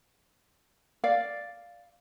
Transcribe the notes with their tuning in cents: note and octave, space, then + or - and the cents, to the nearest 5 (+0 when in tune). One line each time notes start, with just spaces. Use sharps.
D5 +0 F5 +0